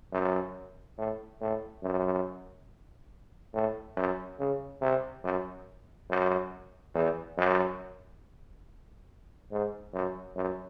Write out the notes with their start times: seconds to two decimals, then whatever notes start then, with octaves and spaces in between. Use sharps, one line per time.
0.13 F#2
0.98 A2
1.41 A2
1.83 F#2
3.54 A2
3.97 F#2
4.39 C#3
4.81 C3
5.24 F#2
6.10 F#2
6.95 E2
7.37 F#2
9.51 G#2
9.93 F#2
10.36 F#2